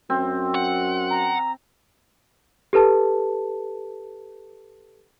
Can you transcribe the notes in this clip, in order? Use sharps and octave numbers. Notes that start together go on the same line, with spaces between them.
F#2 C4
F#5
A#5
G4 A4 B4 A5